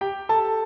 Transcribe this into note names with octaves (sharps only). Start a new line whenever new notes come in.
G4 G5
A4 A5